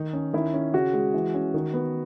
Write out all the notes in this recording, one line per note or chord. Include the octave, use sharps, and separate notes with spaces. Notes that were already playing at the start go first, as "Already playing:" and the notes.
Already playing: D#3 D#4
C#4
D#3 E4
C#4
C#3 F#4
G#3
E3
C#4
D#3
B3